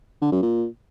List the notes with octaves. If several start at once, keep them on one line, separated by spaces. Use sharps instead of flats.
D3
F#2
A#2